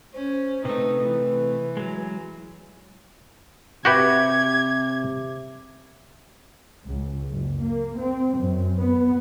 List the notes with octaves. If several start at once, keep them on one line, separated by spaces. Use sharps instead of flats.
C#4 C5
C3 A3 D#4 B4
E3
F#3 G#3
C3 F#4 G4 B4 E5 D6 G#6
C#2
F#1
A#3
C4
F#2
B3